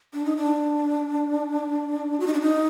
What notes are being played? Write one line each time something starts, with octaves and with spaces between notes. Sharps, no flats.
D4
D#4
D4
F#4
D#4
D4
D#4